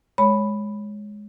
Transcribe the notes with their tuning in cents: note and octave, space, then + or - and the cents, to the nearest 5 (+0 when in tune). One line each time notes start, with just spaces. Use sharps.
G#3 +0 C#5 +0 B5 +0